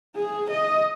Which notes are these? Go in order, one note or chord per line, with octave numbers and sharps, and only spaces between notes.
G#4
D#5